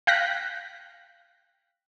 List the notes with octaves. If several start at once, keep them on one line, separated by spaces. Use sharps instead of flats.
F5 G5 F#6 A#6 B6